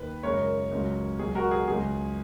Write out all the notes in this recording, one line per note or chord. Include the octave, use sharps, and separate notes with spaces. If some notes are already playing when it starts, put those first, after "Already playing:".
Already playing: D#2 D#3 B4
F#2 C#3 G#3 A#4 C#5
C#2 C#3 F#3
C#2 B2 F#3 G#4
F#4 A#4
G#4
C#2 C#3 F#3 G#4